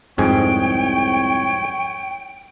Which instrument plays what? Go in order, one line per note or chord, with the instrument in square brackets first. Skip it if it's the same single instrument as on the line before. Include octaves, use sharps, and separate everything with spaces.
[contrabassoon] C2 [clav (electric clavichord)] F2 G#2 G#5 [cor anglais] C#5 [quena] G5